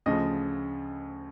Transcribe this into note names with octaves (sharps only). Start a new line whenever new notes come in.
D2 C#3 F3 D#5